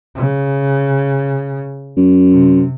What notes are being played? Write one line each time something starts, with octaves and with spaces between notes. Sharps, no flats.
C#3
F#2
C3